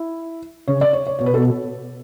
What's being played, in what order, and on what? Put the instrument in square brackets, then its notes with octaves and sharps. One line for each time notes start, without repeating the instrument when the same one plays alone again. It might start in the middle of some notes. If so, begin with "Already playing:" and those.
Already playing: [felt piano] E4
[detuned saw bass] C#3 [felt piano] C#5
[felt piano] D5
C#5
C#5
[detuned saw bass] B2 [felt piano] C#5
[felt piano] B4
A4